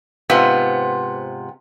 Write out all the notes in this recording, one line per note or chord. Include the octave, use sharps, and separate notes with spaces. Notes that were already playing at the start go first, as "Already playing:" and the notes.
G#2 C3 B3 F4